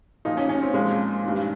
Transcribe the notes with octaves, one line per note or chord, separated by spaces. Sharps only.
A#2 F3 D#4
C#4
C#4
C4
A#2 F3 G#3
G2 D#3